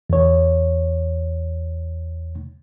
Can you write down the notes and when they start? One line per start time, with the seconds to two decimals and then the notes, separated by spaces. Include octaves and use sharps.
0.10 E2 C#5